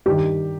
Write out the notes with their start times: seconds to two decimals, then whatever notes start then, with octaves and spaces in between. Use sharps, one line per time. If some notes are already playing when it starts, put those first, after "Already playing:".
0.06 G2 D#3 G4